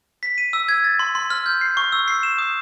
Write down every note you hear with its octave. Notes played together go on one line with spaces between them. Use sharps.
B6
D#7
E6
G#6
A6
C6
C6
F6
G6
C7
C#6
E6
C7
E7
D#6